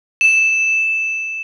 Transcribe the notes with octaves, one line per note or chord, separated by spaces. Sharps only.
E7